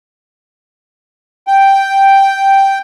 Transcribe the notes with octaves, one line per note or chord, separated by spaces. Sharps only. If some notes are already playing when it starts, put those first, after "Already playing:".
G5